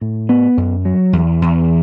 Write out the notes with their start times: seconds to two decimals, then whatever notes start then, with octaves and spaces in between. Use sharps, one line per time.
0.01 A2
0.29 B3
0.57 F#2
0.85 F#3
1.13 E2
1.42 E2